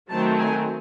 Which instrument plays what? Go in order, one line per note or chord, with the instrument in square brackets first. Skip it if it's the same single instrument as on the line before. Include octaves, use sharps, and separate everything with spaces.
[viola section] D#3 F#3 A3 C4 A5
G#5